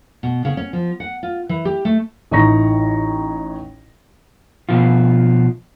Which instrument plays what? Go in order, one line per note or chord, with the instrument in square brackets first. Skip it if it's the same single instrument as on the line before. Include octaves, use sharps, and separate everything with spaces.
[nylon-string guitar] B2
C#3
C#4
F3
F#5
F4
E3
G4
A3
[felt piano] A1 E3 D#4 A#5 C#6 A#6
[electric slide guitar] B2 F3 F4